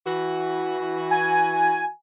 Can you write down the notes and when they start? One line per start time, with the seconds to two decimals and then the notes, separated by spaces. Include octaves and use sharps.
0.06 E3 F#4
1.11 G#5